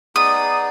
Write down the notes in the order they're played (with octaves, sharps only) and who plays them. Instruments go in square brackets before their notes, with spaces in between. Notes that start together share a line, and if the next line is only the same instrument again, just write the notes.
[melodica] B3 D#4 G#4 D5 [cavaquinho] D#6